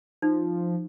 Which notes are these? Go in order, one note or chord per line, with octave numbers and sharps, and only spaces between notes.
F3 D#4